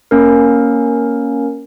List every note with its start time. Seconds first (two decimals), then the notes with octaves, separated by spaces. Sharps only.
0.11 A#3 C#4 A#4